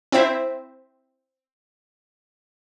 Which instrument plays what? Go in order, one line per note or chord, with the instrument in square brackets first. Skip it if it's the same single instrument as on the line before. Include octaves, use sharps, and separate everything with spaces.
[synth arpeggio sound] C4 E4 C5 E5